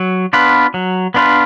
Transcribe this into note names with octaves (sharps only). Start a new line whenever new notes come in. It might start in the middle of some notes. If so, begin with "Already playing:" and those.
Already playing: F#3
B3 D4 F4 B4
F#3
B3 D4 F4 B4